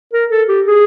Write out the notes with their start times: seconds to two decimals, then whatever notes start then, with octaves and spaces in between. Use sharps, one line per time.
0.13 A#4
0.30 A4
0.49 G4
0.67 G#4